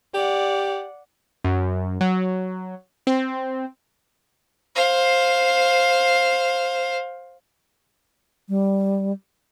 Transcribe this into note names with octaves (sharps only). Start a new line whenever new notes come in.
G4 D5 F#5
F#2
F#3
C4
C5 F5
G3